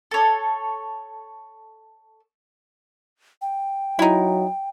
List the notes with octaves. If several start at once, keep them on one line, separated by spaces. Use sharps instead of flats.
A4 C#5
G5
F#3 D#4 E4